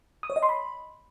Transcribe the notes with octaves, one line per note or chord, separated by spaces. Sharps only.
D#6
C#5
D#5
C6
B5